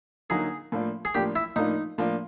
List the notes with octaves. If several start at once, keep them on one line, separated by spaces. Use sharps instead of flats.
D3 F#3 A#3 D#4 G#4
A2 F3 A#3 D4
G#4
A2 F3 A#3 D4 G4
E4
A2 F3 A#3 D4 D#4
A2 F3 A#3 D4